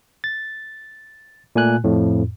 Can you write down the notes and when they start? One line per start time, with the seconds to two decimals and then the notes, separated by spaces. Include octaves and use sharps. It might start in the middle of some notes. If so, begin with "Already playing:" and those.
0.24 A6
1.56 A#2 A3 G#5 F#6
1.84 F2 A2